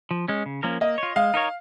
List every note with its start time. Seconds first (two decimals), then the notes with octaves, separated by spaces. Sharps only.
0.11 F3
0.28 G#3 C#4
0.46 C#3
0.63 F3 A#3 C#4 A#4
0.81 A#3 D#5
0.98 F4 C#5
1.16 G#3 F5
1.34 D#4 A#4 C#5